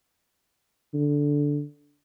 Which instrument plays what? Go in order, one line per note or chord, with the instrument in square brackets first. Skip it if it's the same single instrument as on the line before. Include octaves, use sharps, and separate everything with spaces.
[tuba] D3